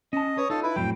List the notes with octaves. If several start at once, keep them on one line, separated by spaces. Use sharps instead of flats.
C#4 D#5 A5
B4 C#5 D#6
D#4 F4 A4
E4 B4
F2 A2 F#3 G5